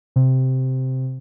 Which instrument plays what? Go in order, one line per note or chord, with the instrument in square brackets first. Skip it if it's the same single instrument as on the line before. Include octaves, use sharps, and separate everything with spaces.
[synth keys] C3